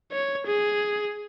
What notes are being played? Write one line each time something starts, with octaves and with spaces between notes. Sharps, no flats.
C#5
G#4